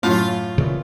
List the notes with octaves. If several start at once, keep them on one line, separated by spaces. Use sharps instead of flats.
F#2 A2 F4
A#2 C#3 E3